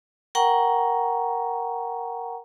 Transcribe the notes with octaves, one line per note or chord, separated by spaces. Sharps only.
A#4 F#5 G5 A#5 C#6